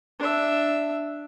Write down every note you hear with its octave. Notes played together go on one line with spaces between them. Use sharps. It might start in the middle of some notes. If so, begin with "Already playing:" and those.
D4 E5